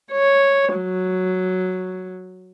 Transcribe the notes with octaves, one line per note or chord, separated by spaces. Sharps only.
C#5
F#3